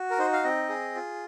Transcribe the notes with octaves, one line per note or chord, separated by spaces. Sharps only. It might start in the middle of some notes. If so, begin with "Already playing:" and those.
Already playing: F#4
A#4
D#4 C5
F5
C4 D#5
G#4
F4